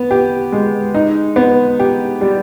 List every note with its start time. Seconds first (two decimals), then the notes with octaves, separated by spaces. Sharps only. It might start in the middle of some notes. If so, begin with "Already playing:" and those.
Already playing: B3
0.11 G4
0.52 G#3
0.95 D#4
1.36 B3
1.79 G4
2.21 G3